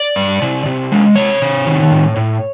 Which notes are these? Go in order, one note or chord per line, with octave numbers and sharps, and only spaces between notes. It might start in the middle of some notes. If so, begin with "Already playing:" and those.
Already playing: D5
G2
C3
C3
G#3
C3 C#5
C3
D#3
A2
A2